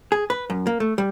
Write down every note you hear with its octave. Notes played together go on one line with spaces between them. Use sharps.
G#4
B4
F#2
A#3
A3
G3